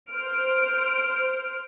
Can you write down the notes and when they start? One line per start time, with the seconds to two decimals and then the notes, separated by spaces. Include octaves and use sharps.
0.13 C5 F6 D7